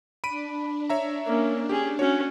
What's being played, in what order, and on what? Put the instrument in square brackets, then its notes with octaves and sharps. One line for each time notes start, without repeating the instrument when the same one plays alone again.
[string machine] D4 [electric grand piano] B5 D7 D#7
[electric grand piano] C#5 E5 A#5
[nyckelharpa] A#3 C#4
[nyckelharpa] C#4 G#4 [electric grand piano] G4
[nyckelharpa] C#4 F#4 [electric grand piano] C#5